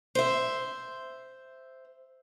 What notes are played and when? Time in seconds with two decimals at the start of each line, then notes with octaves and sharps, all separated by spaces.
0.15 C5 E5